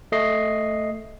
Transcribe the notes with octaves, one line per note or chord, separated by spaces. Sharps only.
A3 D#5 C7